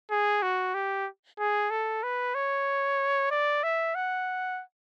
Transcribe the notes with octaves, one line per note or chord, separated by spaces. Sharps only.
G#4
F#4
G4
G#4
A4
B4
C#5
D5
E5
F#5